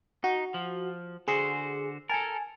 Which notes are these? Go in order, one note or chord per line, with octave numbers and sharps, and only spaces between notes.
D#4 F#4
F3
D3 F#4 G#4 C5
A4 A#4 G#5 A5